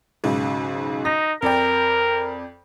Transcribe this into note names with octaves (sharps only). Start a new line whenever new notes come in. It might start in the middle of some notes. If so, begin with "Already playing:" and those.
B1 G#2 C#3
D#4 A#6
F2 A#4 D5 G5